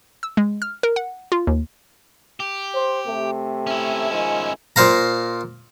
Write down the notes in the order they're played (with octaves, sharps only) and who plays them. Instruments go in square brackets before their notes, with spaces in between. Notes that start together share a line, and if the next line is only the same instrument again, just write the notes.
[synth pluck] E6
G#3
F6
A#4
F#5
F4
D#2
[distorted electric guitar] G4
[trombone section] C5
C3 A3
[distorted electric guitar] C#4 E4
[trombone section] D#3 F3 G#3 [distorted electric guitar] C#4 E4
[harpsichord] A#2 C5 F5 A#5